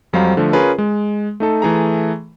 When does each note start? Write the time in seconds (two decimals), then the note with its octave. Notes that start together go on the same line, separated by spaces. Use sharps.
0.13 F2 F#3 G3 C5 F5 A#5
0.37 D3 F3 A3
0.53 C#4 F4 G#4 A#4 B4 C#5
0.78 G#3
1.40 A3 D#4 A4
1.62 E3 A3 G#4 A#5